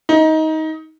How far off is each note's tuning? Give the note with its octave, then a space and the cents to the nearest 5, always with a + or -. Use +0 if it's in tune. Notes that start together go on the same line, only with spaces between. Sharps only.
D#4 +20